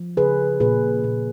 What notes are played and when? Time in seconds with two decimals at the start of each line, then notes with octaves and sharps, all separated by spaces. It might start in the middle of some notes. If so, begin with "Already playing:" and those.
Already playing: F3
0.17 C#3 G#4 B4
0.60 A#2 G#4 B4
1.04 A#2